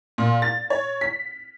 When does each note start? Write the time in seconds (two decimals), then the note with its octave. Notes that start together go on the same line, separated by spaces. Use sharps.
0.18 A#2
0.42 A6
0.70 C#5
1.01 B6